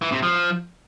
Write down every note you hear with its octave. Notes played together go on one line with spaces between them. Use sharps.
E3
C3
F3